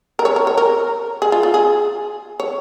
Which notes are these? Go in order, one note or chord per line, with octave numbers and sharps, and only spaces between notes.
A#4
C#5
A#4
C#5
A#4
G#4
F4
F4
G#4
C#5